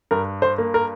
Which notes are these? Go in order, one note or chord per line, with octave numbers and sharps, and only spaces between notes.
G2 A#4
C5
A#3
A#4